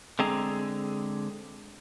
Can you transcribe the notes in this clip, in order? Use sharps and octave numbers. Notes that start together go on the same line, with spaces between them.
D3 G#3 C4 G#4 A#5